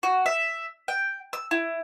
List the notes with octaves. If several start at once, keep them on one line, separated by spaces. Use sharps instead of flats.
F#4
E5
G5
E6
E4